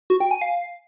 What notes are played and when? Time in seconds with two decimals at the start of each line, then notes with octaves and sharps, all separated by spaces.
0.10 F#4
0.20 G5
0.31 G#5
0.41 F5